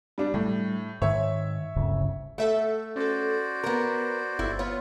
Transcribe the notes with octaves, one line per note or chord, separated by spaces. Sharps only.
G3 D4
A2 G3
G#2 D#3 C#5 E5
D1 G1 C#3
A3 A4 E5 F#5
C#4 F#4 A4 C5 D5
B3 A#4 A#5 A#6
G1 E4
B3 F4 C#5